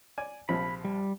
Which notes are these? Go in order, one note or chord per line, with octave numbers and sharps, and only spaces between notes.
D5 G#5
A#1 C3 F3 B5
G3